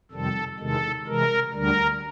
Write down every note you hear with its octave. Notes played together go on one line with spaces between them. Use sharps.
F2 C3 D#3 G3 C4 A4
E2 C3 D#3 G#3 A4
C3 E3 G#3 A#4
D2 D3 G3 A#4